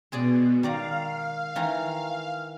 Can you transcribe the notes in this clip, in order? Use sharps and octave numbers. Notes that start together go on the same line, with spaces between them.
B2 G#3 G#4 D5
D#3 D5 F5 A#5
D#3 E3 A#5